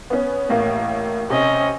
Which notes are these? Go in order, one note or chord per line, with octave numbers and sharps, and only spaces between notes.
B3 C#4
A1 A2 A#3
C3 C#4 D#5